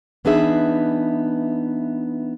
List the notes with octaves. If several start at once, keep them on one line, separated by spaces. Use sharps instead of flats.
E3 B3 D4 D#4 G#4 E5